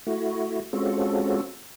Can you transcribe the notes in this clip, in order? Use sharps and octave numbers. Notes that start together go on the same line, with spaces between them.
A3 E4 F#4
G#3 C4 C#4 F4 F#4 A4